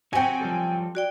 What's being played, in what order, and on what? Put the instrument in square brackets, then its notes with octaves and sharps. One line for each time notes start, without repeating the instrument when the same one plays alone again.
[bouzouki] F#3 C4 [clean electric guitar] F#4 G4 C#5 [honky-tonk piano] G5 G#5
[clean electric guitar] F3 G3 A4
[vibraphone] F#4 D5 G5